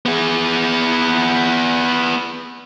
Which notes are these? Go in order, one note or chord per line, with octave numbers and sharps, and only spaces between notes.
B3 G#4